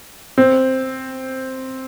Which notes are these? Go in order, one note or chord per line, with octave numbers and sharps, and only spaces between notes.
C4